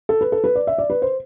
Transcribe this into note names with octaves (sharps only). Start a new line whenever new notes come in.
A4
B4
A4
B4
D5
E5
D5
B4
C5